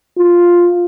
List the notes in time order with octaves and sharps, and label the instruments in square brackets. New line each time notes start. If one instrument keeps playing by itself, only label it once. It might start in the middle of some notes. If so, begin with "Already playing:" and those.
[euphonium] F4